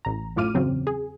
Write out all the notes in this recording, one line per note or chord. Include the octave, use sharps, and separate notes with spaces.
A1 A#5
F#2 A2 F4 D6 F6 D#7
E2 C#3 F#3 C4
G#4